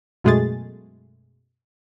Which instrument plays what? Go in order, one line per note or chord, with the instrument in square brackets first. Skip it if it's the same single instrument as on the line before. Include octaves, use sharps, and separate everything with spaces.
[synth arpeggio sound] F#2 B2 G#3 A3 G#4 A6